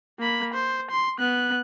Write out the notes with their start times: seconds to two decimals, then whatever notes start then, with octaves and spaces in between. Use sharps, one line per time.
0.20 A#3 B5
0.54 C5
0.91 C6
1.19 B3 F#6